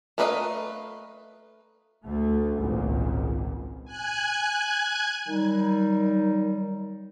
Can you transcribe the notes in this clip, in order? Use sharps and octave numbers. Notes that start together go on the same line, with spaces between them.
A3 A#4 B4 D#5 F5
D2 A3
G#1 C#2 A#2
G#5 F#6 G#6
D#3 F#3 G3 D#4